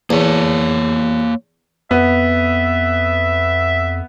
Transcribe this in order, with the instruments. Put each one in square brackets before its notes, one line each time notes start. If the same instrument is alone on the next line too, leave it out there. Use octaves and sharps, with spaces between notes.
[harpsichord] E2 [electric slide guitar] A#3 C#5
[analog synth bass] F2 [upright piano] B3 [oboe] E5